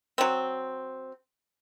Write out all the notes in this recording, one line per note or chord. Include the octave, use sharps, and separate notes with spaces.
F#3 C4